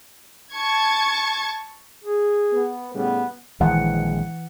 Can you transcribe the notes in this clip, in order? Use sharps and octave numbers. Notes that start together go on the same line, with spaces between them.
A5 C#6 G#6
G#4
B3
A2 C#3 G3 B3
A#1 D#3 E3 G#3 F#5